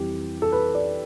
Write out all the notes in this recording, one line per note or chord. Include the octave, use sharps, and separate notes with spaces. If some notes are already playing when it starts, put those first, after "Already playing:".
Already playing: F2 E3 G3 G4
A4
B4
D5